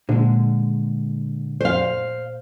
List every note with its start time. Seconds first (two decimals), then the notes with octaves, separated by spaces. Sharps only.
0.09 A#2 D3 G#3
1.61 C5 F5